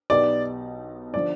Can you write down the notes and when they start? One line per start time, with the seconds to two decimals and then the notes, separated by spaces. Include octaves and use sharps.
0.10 B1 B2 B3 D#4 G4 D5
1.14 D3 F3 D5